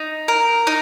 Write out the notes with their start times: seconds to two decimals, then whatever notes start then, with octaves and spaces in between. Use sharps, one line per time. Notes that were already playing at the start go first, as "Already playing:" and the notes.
Already playing: D#4
0.28 A#4
0.67 D#4